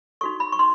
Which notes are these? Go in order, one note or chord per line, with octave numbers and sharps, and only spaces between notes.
D#4 F#4 A4 C#6
B5
C#6
D#4 C6